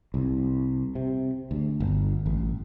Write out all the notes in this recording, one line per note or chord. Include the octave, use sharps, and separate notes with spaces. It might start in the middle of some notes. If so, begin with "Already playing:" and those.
C2
C3
D2
G1
A1